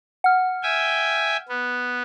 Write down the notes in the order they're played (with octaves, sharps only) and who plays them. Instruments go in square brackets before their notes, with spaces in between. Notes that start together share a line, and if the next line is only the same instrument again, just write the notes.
[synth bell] F#5 F6
[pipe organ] E5 G5 G#5
B3